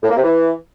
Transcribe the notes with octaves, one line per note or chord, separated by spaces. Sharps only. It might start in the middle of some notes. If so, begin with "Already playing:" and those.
A2
A#3
C3
E3